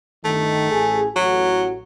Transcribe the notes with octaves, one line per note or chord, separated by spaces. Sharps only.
G1 D#3 A3
A1 G#4 G#5
A1 F#3 F#4